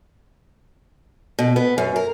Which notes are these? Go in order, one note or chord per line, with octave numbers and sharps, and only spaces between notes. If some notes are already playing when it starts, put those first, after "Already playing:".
B2
B3
F#2
A#4